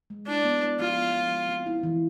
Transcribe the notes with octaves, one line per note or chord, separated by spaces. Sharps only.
G#3
D4 E4
B3
E4
F3 F4
B3
F3
G#3
C4
E4
E3